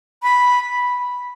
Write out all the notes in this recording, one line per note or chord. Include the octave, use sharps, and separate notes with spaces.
B5